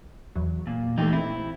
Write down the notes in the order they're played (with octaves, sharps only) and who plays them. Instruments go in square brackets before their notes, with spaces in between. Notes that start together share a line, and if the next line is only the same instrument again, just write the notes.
[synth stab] E2 F#3
[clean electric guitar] A#2
[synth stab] E3 A3 [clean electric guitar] D#4 G4
[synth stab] A#1 C4 [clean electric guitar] E4